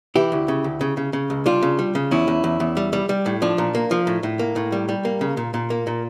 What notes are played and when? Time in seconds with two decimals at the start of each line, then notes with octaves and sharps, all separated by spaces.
0.15 E3 E4 G4
0.32 D2
0.48 C#3
0.64 D2
0.81 C#3
0.97 C#3
1.13 C#3
1.30 C#2
1.46 G3 D4 F4
1.63 C#3
1.79 G3
1.95 C#3
2.11 E2 C#4 E4
2.28 E2
2.44 E2
2.60 E2
2.77 G3
2.93 G3
3.09 G3
3.26 A2
3.42 F3 D4
3.58 A#2
3.75 A#3
3.91 F3
4.07 A2
4.23 A2
4.39 A#3
4.56 A2
4.72 G3
4.89 G3
5.05 A#3
5.21 C#3
5.37 A#2
5.54 A#2
5.70 A#3
5.87 A#2